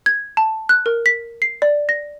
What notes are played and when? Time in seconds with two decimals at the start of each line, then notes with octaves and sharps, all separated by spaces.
0.06 G#6
0.37 A5
0.69 F#6
0.86 A#4
1.06 B6
1.42 C7
1.62 D5
1.89 A#6